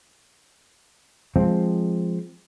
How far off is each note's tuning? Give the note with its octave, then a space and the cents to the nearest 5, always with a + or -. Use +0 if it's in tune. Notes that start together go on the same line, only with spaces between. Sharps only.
F3 +0 G#3 +0 C4 +0